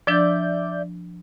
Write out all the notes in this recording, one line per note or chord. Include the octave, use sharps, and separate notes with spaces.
F3 D4 D5 E5 G6